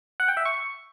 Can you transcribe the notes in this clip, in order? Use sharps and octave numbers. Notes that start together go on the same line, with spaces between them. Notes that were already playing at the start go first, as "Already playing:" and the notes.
F#5
G5
E5
C#6